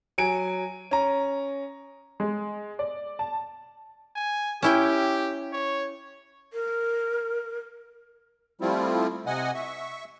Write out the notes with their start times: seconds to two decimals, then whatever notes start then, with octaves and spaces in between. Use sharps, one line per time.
0.18 F#3 G#5 D7
0.91 C#4 A#5
2.20 G#3
2.79 D5
3.19 A5
4.16 G#5
4.63 C#4 E4 G4 G5
5.53 C#5
6.53 A#4
8.61 F3 G3 A3 C4 E4 F4
9.26 C3 D#5 F#5 G#5
9.54 E5 C#6